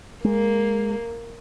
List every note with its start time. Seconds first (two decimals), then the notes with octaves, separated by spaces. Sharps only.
0.24 G#3 A#3